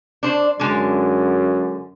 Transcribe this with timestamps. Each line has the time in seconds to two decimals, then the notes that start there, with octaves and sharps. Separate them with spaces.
0.23 D4 C5
0.59 F#2 D3 G#3